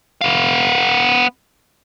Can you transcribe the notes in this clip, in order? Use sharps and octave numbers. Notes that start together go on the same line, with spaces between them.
B3 F5